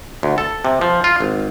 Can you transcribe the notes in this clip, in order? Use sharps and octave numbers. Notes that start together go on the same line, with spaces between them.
D2
A4
C3
F3
F4
G#1